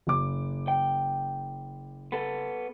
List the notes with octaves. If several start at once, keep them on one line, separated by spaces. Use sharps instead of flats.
F#1 D6
G5
B3 A4